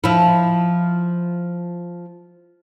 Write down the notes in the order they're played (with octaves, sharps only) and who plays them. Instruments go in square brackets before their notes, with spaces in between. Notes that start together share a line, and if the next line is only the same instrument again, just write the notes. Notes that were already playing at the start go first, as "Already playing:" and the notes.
[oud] F3 E4